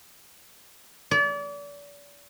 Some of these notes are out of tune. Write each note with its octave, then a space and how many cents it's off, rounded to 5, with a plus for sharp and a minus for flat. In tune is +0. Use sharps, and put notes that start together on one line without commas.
D5 -35